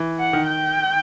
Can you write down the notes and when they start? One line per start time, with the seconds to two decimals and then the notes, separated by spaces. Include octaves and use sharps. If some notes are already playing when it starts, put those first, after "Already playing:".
Already playing: E3
0.19 F#5
0.33 D#3
0.47 G5